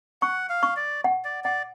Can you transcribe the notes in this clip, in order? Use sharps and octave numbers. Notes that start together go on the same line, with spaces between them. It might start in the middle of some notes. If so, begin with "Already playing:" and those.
F#5 C#6
F5
C#6
D5
F#5
D5
D5 F#5